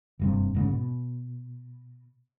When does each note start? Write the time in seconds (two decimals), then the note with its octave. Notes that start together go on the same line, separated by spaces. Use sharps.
0.19 F#1 G2 C3
0.54 E1 G#2 C#3
0.71 B2